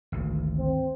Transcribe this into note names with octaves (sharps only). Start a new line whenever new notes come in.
G#1 D2
C4